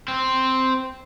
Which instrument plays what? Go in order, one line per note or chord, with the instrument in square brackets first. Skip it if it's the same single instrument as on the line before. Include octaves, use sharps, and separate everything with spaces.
[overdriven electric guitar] C4